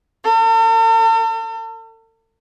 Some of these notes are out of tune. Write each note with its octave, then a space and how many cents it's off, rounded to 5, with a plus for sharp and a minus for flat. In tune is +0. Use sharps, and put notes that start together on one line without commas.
A4 +45